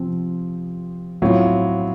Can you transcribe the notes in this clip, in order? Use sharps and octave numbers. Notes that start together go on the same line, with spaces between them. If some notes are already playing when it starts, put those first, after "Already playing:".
Already playing: C3 F3 C4
A2 F#3 C4 F4